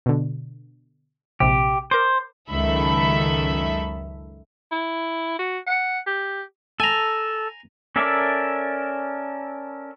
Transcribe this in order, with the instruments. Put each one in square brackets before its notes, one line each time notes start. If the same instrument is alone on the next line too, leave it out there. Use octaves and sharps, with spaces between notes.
[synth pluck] B2 D3
[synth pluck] A#1 C3 [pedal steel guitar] G4
[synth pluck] A#4 D6 [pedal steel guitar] C5
[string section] C#2 F#2 D#3 A4 E5 B5
[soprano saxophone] E4
F#4
F#5
G4
[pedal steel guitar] A4 [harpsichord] G#5 A#5
[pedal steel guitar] C#4 A4 A#4 D5 E5